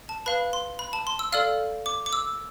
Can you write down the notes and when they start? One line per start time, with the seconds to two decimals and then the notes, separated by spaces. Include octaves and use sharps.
0.09 A5
0.26 B4 F5 B5
0.53 C6
0.79 B5
0.93 A5
1.07 C6
1.19 E6
1.32 A4 D5 F5 F6
1.86 D6
2.06 D6
2.13 E6